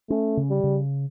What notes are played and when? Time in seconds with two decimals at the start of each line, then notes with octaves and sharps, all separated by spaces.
0.10 A3 C#4
0.37 C#3
0.50 G3
0.64 C#3